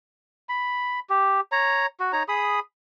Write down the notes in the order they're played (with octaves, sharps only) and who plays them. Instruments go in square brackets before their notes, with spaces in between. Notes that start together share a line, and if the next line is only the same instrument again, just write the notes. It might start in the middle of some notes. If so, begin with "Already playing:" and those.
[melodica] B5
G4
C#5 A#5
F#4
D#4 C#5 A#5
G#4 B5 D#6